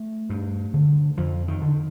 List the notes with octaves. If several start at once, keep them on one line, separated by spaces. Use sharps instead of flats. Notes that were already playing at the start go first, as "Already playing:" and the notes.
Already playing: A3
G2
D3
F2 F3
D#3
D3